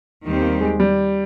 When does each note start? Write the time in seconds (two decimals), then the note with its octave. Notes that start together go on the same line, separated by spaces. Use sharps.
0.24 D#2 D#3 G3 C4 G4
0.42 A#3
0.61 G#3
0.80 G3